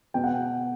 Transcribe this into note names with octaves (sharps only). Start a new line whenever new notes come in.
B2 G5
F#5